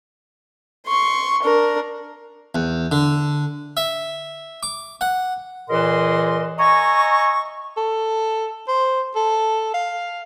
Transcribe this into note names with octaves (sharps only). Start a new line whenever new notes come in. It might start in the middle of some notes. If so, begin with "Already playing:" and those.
C6 C#6
D4 A#4
E2
D3
E5
D6
F#5
C#2 A#2 E3 A#4 D#5 C6
D#5 E5 G#5 A#5 C#6
A4
C5
A4
F5